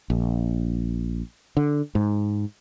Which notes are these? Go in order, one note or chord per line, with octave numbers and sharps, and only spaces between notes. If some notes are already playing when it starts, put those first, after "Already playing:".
A#1
D3
G#2